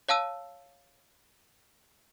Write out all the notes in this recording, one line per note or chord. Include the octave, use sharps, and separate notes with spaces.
C#5 F5 A5 E6 D#7